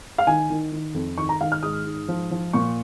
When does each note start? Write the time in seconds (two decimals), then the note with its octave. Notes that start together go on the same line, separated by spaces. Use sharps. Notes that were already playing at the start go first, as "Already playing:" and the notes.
0.18 F5
0.27 D#3 G#5
0.50 D#3
0.72 D#3
0.94 F2
1.17 D#3 C#6
1.29 A#5
1.41 D#3 F5
1.52 F6
1.62 G#2 D#6
1.86 G#2
2.08 F3
2.31 F3
2.53 A#2 C#6